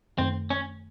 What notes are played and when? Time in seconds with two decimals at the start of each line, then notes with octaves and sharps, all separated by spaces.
0.18 F#2 D#3 A3 C4
0.50 C#4